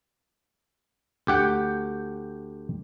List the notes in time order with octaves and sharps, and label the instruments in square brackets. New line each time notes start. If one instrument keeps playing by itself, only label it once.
[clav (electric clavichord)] D2 G4 F#5 G5